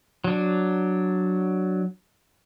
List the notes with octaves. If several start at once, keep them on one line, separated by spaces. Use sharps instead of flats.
F#3 D4